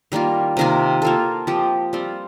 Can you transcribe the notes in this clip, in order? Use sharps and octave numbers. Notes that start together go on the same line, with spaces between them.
D#3 G3 A#3 F4
C3 D#3 A#3 F4
A#3 F4 A4
F3 C4 G4
G3 C4 F4